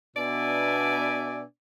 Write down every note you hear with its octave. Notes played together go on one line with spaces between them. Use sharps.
B2 B3 D4 D5 E5 G#5